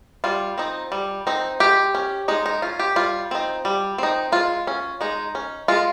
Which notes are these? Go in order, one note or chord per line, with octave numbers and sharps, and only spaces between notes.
G3 F4
C4 D#4
G3
C4 D#4
G#3 G4
C#4
G#3 D#4
D#4
C#4 F4
G4
G3 F4
C4 D#4
G3
C4 D#4
G#3 F4
C#4
G#3 D#4
C#4
G#3 F4